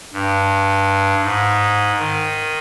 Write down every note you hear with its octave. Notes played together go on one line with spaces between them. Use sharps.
G2
G#2
D#3